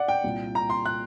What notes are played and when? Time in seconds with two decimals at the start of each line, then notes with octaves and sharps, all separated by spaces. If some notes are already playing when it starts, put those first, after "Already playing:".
Already playing: D5 F#5
0.08 G5
0.24 C2 A#2
0.55 A#5
0.70 C6
0.85 F#6